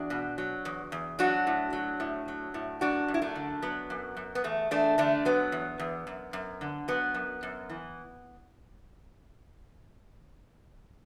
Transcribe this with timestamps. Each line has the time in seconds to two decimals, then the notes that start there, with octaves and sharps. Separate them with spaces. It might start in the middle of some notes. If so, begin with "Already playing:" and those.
Already playing: E2 D4 F#4
0.10 B2
0.38 F#3
0.65 E2
0.92 E2
1.19 F#3 D4 F#4
1.47 A2
1.73 F#3
2.00 A2
2.28 F#3
2.54 A2
2.81 F#2 D4 F#4
3.08 F#2
3.14 E4
3.22 A3 D4
3.35 D3
3.62 F#3 B3
3.90 F#2
4.17 F#2
4.35 B3
4.44 E2 A3
4.71 E2 A3 D4
4.98 D3 A3 D4
5.25 F#3 B3
5.52 E2
5.79 E2
6.07 F#2
6.33 F#2
6.61 D3
6.88 F#3 B3
7.15 F#2
7.43 F#2
7.70 E3